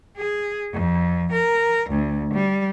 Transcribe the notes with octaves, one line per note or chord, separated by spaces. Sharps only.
G#4
F2
A#4
D2
G3